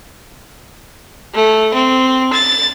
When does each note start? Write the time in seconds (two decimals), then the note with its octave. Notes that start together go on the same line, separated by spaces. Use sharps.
1.34 A3
1.74 C4
2.33 A6